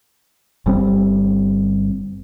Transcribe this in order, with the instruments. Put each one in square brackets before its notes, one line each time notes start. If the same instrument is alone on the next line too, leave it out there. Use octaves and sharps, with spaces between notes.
[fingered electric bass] G1 G3 C4